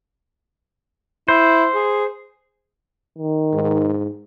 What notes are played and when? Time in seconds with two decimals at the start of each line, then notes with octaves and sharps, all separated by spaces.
1.28 E4 C5
1.74 G#4
3.18 D#3
3.53 G#2